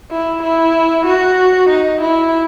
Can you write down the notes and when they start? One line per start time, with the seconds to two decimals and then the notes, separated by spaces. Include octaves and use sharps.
0.11 E4
0.43 E4
1.06 F#4
1.70 D#4
2.01 E4